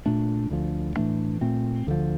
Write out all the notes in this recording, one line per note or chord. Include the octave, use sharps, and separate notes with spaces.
A#2 A3 D4
D2 D3 F3
A2 E3 A3 D4
A#2 A3 C4
D2 D3 F3